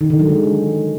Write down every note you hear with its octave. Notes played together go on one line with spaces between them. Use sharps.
D#3
D3
F#3
G#3